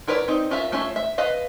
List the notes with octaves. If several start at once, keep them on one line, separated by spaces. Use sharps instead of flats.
E4 A#4 B4 C#5 D5
C4 D#4
C#4 F4 A#4 E5
A3 C#4 F4 C#5 E5
E5
B4 D#5 F5